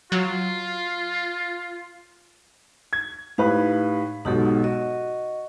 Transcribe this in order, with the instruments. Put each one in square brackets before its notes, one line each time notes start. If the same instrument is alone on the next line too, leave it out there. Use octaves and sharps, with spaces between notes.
[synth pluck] F#3 [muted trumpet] F4
[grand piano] G#6
[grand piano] A2 B4 B5 [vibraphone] D#4 G4 F5
[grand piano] B1 G#2 B2 [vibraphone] D#4 G4 A4
[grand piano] F#4 [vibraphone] D#5